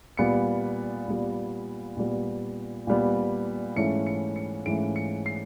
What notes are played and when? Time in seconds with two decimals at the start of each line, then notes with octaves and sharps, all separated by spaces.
0.17 A#2 G3 B3 C#7
1.07 A#2 G3 B3
1.97 A#2 G3 B3
2.87 A#2 G3 B3
3.76 G#2 E3 A3 C#4 C#7
4.07 C#7
4.36 C#7
4.66 G#2 E3 A3 C#4 D7
4.96 C#7
5.26 C7